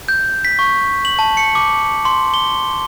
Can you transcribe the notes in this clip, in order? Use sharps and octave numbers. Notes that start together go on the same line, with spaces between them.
G6
B6
C#6
F#7
A5
C#7
D6
C6
G7